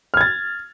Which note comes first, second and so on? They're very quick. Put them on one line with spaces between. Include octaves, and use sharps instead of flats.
F6 G#6 A6